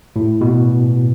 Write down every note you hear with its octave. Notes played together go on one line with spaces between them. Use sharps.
A2
B2